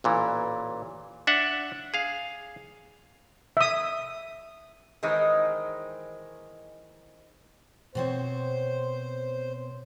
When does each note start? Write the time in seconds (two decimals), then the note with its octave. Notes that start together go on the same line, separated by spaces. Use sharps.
0.04 A1 A#2 E3
1.27 D4 E5 F#5
1.94 G#4 F5
3.57 E5 D#6
5.03 D#3 E3 G#3 C4 D#4
7.95 B2 C4 C5 C#5